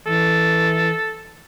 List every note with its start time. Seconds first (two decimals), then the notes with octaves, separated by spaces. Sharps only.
0.07 E3 A4